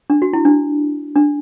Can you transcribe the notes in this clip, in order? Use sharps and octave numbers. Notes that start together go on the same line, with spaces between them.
D4
F#4
E4
D4
D4